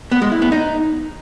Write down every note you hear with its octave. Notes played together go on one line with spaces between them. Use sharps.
B3
G#3
E4
B3
D#4